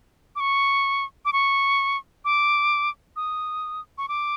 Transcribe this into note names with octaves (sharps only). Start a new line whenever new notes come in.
D6
C#6
D6
C#6
D6
D#6
C#6
D6